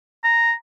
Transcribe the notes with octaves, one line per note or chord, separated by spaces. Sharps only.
A#5